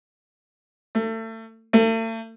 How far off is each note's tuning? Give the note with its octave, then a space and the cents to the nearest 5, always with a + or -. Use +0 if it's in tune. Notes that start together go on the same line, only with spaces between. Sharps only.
A3 +30
A3 +40